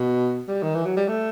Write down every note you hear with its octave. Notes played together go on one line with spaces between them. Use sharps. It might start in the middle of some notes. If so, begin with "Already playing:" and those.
Already playing: B2
G3
D#3
E3
F#3
G3
A3